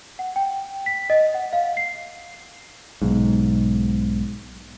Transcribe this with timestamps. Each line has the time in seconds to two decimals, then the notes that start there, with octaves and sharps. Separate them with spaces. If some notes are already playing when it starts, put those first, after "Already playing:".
0.19 F#5
0.36 G5
0.86 B6
1.10 D#5
1.34 F#5
1.53 F5
1.77 C7
3.02 B1 G#2